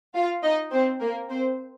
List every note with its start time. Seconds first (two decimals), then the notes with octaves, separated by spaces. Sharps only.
0.15 F4 F5
0.43 D#4 D#5
0.71 C4 C5
1.00 A#3 A#4
1.30 C4 C5